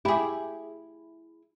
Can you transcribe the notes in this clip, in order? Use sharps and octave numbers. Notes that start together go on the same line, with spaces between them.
E4 G4 G#4 B5